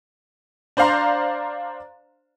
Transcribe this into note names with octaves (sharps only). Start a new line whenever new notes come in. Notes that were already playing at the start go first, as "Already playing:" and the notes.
D4 C5 D5 F5 A#5 C6